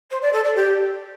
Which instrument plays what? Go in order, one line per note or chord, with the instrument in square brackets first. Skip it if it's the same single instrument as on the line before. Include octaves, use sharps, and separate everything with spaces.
[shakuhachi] C5
D5
A4
D5
G4